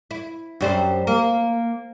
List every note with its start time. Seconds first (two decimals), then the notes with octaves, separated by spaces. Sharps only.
0.11 E4
0.61 F#2 G3 C5
1.07 A#3